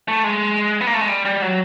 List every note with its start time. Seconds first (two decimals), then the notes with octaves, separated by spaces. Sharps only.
0.08 A3
0.24 G#3
0.81 B3
0.87 A#3
0.94 A3
1.01 G#3
1.08 G3
1.25 G3
1.42 F#3